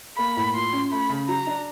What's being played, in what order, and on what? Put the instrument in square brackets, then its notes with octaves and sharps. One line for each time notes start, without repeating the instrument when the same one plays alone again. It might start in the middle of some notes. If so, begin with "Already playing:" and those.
[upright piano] A#3 [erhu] B5
[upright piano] A2
[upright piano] F3 [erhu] C6
[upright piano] C#4
[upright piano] A3 [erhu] B5
[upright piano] C#3
[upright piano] F#3 [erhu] A#5
[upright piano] D4